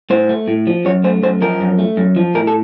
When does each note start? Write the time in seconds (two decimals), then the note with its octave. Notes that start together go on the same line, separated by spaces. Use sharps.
0.10 A2 C5
0.29 A3
0.48 A2
0.67 F3
0.85 F#2 C#5
1.04 A3 C5
1.23 F#2 C5
1.42 F3 A#4
1.60 F#2
1.79 A3
1.97 F#2
2.16 F3
2.35 A2 A#4
2.47 A4